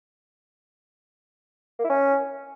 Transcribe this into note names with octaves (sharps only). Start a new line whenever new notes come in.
A#3
E4
C#4